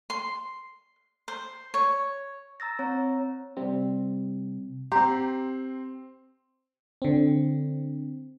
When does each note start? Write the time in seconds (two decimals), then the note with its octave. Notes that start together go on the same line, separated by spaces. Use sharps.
0.10 C6
1.28 C5
1.74 C#5
2.60 A#5 E6 A6 A#6
2.79 C4 C#5 A#5
3.57 C3 G3 C4
4.92 C4 G4 A#5 C6
7.02 D3 C4